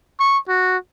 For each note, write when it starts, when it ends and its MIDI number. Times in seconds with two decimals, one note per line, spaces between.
0.19 0.38 85
0.48 0.77 66